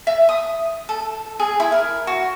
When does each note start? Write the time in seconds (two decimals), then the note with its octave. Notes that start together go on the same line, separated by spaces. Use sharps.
0.07 E5
0.29 D#6
0.89 A4
1.39 G#4
1.60 E4
1.72 A#4
2.07 F#4